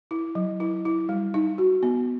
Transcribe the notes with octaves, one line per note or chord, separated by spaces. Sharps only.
E4
F#3
E4
E4
G3
D#4
F#4
B3